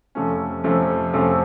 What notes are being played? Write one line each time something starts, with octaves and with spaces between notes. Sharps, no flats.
F2 C3 F3 A3 C#4
F2 C3 F3 A3 C#4
F2 C3 F3 A3 C#4